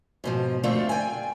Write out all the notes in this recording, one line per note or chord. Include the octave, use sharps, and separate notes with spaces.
G#2 B2 F3
D3 A3 C4 D4 F4 A4
G5 G#5